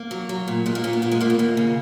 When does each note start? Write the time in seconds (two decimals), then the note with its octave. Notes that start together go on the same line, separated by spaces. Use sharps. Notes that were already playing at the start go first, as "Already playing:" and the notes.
Already playing: A#3
0.11 F#3
0.29 F#3
0.48 A#2
0.66 A#2 G#3
0.75 A#3
0.84 A#2 C#4
0.93 B3
1.02 A#2 A#3
1.11 G#3
1.20 A#2 A#3
1.30 B3
1.39 D#2 A#3
1.57 C#3